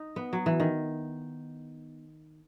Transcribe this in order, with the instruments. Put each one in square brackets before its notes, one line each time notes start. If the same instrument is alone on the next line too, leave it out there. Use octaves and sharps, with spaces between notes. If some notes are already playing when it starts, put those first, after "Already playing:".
Already playing: [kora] D#4
B3
F#3
E3
D#3